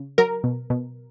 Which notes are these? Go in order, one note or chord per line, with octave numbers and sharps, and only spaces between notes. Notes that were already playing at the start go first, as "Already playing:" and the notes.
Already playing: C#3
F#3 A#4
B2
B2